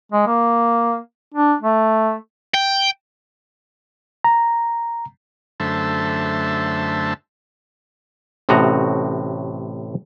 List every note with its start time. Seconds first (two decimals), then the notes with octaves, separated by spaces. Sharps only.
0.12 G#3
0.27 A#3
1.34 D4
1.62 A3
2.54 G5
4.24 A#5
5.60 F#2 D3 A3 C5 E5 A5
8.49 A1 A2 C3 F#4 D#5 A#5